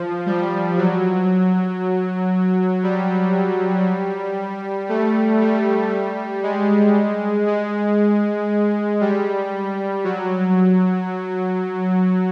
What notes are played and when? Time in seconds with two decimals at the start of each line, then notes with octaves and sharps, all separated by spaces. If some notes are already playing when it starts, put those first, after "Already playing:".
Already playing: F3
0.26 G3
0.78 F#3
2.83 G3
4.89 A3
5.41 G3
6.43 G#3
7.47 G#3
9.01 G3
10.04 F#3